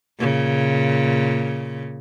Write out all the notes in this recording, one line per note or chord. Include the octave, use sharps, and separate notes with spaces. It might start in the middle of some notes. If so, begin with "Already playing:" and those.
A#2 C#3